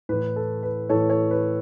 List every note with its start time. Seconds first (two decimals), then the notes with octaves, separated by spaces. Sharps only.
0.09 A2 E3 B4
0.36 A4
0.63 B4
0.90 A2 E3 A4 C#5
1.10 A4 C#5
1.31 B4